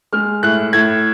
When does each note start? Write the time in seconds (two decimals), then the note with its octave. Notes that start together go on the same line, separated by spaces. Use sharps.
0.13 G#3 F6
0.43 A2 F#6
0.73 A2 G#6